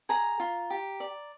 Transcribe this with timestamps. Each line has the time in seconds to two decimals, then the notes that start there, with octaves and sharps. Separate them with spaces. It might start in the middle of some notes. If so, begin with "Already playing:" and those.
0.09 G#4 A#5
0.40 F4
0.70 G4
1.00 D5